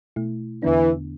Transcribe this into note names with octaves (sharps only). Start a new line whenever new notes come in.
B2 A3 E4
E2 D3 E3 B3 D4